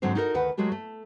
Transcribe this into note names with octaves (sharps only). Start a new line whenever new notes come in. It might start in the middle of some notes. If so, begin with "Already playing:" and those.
G#2 D3 F#3 C4 C5
D#4 E4 F#4 A4 A#4 D#5
D2 D#3 B4 F#5
F#3 G#3 A3 F#4 G4
A3